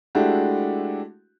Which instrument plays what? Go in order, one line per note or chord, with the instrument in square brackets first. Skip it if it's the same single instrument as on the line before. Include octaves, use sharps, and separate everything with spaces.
[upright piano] G#3 A3 D4 E4 F#4 G4